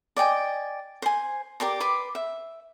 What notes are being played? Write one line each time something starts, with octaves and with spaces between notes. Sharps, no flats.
D5 D#5 G5 G#5
C5 G#5
G4 A#4 D5 C6
B4 C6 D6
E5